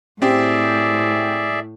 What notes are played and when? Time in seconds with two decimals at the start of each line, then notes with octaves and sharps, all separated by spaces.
0.22 A2 C4 G4 G#4 D5 E5